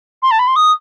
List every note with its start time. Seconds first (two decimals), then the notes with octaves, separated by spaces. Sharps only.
0.23 C6
0.31 A5
0.39 B5
0.48 C6
0.56 D#6